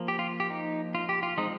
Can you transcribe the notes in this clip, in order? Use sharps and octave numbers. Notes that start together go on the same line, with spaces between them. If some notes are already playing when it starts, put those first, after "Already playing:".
Already playing: F3 A#3
G4
F4
G4
D#4
F4
G4
F4
F3 G#3 C4 D#4